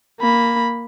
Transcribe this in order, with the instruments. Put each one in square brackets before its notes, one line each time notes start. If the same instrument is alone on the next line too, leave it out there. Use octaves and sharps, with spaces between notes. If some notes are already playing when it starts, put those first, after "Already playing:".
[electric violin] A#3 B5